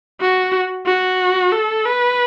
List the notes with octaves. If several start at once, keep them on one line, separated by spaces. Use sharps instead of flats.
F#4
F#4
A4
B4